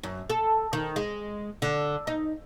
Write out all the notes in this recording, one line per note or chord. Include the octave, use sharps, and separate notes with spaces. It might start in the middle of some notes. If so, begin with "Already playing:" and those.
F#2
A4
D#3
G#3
D3
D#4